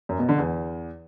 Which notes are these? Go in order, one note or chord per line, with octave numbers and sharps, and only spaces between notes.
F#2
B2
D3
E2